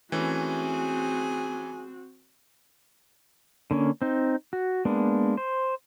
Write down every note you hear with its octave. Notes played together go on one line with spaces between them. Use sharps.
E3 A3 C4 C#4 F#4 G#4
D3 A#3 C#4
C4 D#4
F#4
G#3 A#3 B3 D4
C5